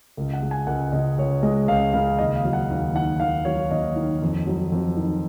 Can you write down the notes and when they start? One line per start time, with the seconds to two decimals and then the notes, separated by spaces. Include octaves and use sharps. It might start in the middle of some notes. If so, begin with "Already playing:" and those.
0.17 C#2
0.33 F#5
0.42 G#3
0.51 G#5
0.67 C#2 F#5
0.92 C#3 D#5
1.18 C#2 C#5
1.43 G#3 D#5
1.68 C#2 F5
1.93 C#3 F5
2.19 D#2 D#5
2.36 F5
2.45 F#3
2.53 F#5
2.70 D#2
2.95 D#3 F#5
3.20 D#2 F5
3.45 F#3 C#5
3.71 D#2 D#5
3.96 D#3
4.22 F2
4.47 F#3
4.72 F2
4.97 D#3